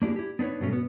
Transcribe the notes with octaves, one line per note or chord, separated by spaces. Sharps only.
A#3 D4 E4 G4 G#4
E4 G4
B3 D4 D#4 B4 C#5
G2 B2 F#3 A3 C#4
B3